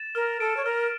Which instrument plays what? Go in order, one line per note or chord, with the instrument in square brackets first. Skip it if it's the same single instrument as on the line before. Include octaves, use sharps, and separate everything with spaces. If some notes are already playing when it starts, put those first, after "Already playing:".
Already playing: [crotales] A6 E7
[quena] A#4 [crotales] F6
[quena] A4 [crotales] D7
[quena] C#5
[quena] A#4 [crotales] F6